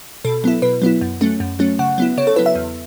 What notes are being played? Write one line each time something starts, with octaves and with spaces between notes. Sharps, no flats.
B2 A4
F#3 B3 E4
B2 B4
F#3 B3 E4
F#2
F#3 A3 C#4
F#2
F#3 A3 C#4
C#3 F#5
F#3 B3 E4
C#3 C#5
A4
F#3 B3 E4 B4
E5
E2